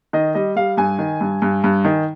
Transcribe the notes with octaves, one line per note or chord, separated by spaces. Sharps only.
D#3 D#5
G3 D#5
G3 F5
G2 G#5
D#3
G2
G2
G2
D#3